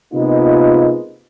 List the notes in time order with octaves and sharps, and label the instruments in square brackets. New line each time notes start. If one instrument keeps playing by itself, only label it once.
[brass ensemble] C3 G#3 A#3 B3 D#4 F4